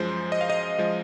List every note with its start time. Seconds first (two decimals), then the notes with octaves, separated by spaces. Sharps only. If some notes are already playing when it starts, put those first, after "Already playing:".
Already playing: F#2 F3 G#3 C5
0.32 D#5
0.41 F5
0.50 D#5
0.78 F3 G#3